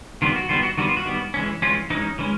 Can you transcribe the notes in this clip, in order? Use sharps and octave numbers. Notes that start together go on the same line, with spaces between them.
D#3 G3 B3 F4
F#4
D#3 G3 B3 F4
F#4
D#3 G3 B3 F#4
F4
F#4
D#3 G3 B3
E3 G#3 C#4
E3 G#3 C#4 F4
E3 G#3 C#4 D#4
E3 G#3 C#4